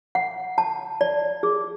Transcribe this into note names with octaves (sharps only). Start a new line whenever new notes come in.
F#5
A5
D5
G#4